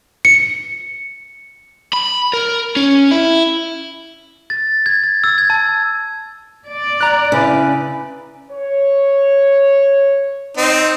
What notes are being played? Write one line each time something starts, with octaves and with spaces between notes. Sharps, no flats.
C#7
B5
A#4
C#4
E4
A6
G#6
A6
E6
G#6
A5
D5
A#5 F#6
C#3 E4 B4
C#5
C4 D#4